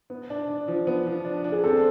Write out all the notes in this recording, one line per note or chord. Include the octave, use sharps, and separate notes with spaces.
B3
D4
D4
F3
B3
F3
D4
D4
G#4
C4 A4